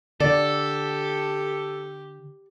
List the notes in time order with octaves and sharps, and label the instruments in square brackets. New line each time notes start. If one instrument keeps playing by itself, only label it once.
[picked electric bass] D3 [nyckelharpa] G4 [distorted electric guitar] A4 [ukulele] D5